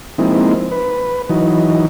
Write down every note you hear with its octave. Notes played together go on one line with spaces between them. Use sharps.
F3 G#3 A#3 C4 D#4 E4
B4
E3 F#3 D#4